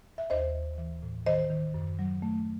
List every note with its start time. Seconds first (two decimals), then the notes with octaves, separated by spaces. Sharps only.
0.18 E5
0.30 D#2 C5 D#5
0.54 D#2
0.78 E3
1.02 A2
1.26 D#3 C5 D#5
1.50 D#3
1.74 F#2
1.99 F#3
2.22 A3